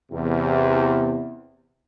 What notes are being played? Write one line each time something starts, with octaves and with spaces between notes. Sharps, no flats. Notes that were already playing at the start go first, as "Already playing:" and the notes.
E2 C3